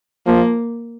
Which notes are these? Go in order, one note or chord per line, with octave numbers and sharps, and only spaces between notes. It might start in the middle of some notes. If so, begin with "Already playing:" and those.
F3 A#3